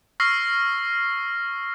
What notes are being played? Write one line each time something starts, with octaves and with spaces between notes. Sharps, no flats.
C#6 E6 F6 A#6 C7